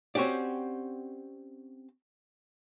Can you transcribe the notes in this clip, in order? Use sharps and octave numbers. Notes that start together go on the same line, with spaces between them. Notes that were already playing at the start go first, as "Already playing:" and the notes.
C4 C#4 F#4 G4 D5